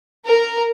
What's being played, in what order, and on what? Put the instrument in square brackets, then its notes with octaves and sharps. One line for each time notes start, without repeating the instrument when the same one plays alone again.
[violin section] A#4